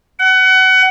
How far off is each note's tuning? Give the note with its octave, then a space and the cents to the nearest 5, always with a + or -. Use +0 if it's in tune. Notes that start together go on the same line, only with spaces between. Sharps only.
F#5 +25